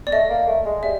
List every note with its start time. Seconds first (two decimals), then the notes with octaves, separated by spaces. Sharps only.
0.07 D5
0.12 A3 D#5
0.30 A#3
0.47 A3
0.65 G#3
0.83 G3 E5